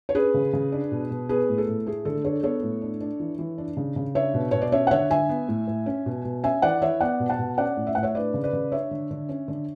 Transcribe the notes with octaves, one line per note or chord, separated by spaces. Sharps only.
C#5
C#4 G#4 B4
C#3
C#3
D4
B2
B2
B3 G#4 B4
A2
A4
A2
A3 G#4
D3 A4
D4 A4 C#5
B3 A4 C#5
A2
D4
D4
E3
E3
D4
C#3
C#3
D4 C#5 E5
B2
B2 C#5
D5
C#4 C#5 E5
F#5
D3 C#5 E5
D3 E5 G#5
B3
A2
A2
C#4
B2
B2
C#4 E5 G#5
E3 D5 F#5
E3 C#5 E5
B3 D5 F#5
B2
F#5 A5
B2
C#4 D5 F#5
A2
E5
A2 F#5
C#5 E5
D4 B4 D5
C#3
B4 D5
C#3
D4 C#5 E5
D3
D3
C#4
D3